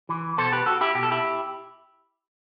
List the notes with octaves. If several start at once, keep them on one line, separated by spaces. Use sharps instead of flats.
E3
B2 A4 C5
G4 B4
F#4 A4
E4 G4
B2 G4
A4
E4 G4